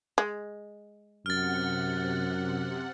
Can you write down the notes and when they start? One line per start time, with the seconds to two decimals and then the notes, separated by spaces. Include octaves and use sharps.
0.18 G#3
1.26 F#2 C3 F#5 F6 A6